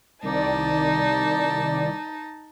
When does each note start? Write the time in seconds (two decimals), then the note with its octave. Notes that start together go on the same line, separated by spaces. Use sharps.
0.23 C2 D#3 D#4 D5 A5